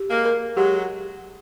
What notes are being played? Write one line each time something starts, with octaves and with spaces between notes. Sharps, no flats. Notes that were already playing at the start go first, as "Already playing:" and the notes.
Already playing: G4
G#3 A#3
A#4
F#3 G#3 G4